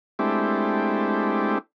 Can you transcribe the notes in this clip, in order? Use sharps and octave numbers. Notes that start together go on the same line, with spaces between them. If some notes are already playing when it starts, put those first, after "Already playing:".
G#3 A3 C4 D4 E4 G4